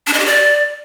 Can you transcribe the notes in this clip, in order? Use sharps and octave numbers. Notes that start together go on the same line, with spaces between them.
D4
D#5
G4
D5